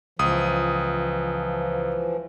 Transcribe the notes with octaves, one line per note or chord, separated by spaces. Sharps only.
C#2 E3 F3 D#6